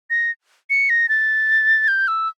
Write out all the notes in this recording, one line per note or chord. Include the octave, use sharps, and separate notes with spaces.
A#6
C#7
A#6
A6
G6
E6